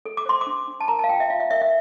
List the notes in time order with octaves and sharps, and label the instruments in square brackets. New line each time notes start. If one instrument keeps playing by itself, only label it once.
[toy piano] A4
D6
C5 C6
D6
D4
D4
A5
A#4 A#5
A5
F5
F4 G5
E5
F4 F5
E5
A#4 E5
E5